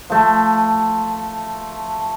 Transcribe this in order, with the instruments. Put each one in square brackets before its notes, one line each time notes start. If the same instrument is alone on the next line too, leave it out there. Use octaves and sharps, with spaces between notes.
[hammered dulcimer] F3 A3